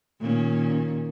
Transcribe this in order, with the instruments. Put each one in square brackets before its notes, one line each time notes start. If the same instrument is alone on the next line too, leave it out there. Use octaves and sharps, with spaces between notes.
[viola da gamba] A#2 D#3 C#4